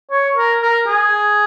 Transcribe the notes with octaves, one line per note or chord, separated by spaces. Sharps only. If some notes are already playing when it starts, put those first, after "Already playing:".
C#5
A#4
A#4
G#4